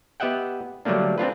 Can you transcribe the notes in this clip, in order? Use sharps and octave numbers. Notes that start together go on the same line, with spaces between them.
B3 G4 D#5 E5 F#5 G5
D3 F#3 G3 A3 A#3 D4
C4 D4 F4 B4